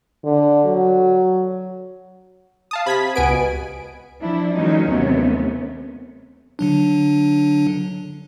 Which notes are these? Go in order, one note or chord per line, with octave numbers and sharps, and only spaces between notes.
D3
F#3
F5 A5 D#6
C3 B5 G#6 B6
C#2 B3 G#5 D7
B2
F3 D4 E4
D3 E3 F#3 G#3 C#4 D#4
D#2 C3 A3 B3 C#4
D3 F#3 D4